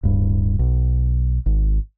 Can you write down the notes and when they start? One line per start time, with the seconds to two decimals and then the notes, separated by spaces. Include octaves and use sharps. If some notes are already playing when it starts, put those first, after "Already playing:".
0.03 D1 G2
0.59 B1
1.46 G#1